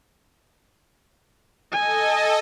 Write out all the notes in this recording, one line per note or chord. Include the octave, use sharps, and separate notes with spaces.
A4 D#5 G#5